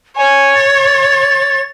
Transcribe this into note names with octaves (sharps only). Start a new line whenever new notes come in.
C#5 G#5
A6